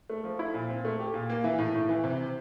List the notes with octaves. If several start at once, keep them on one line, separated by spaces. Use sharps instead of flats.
A3
F3
E4
A#2
C4
A3
G4
A#2
A#3
E3
A2
A2
E3
C3